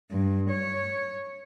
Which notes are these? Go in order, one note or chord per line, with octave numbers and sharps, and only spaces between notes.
G2
C#5